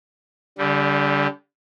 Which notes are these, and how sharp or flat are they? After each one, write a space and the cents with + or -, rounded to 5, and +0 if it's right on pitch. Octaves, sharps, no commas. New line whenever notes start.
D3 -35 G3 +0